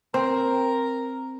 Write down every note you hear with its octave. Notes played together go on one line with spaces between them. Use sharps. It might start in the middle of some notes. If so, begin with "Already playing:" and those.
C4 A#4